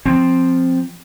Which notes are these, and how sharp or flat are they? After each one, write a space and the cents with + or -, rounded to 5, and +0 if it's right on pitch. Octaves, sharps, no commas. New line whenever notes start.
F3 +0 C4 +0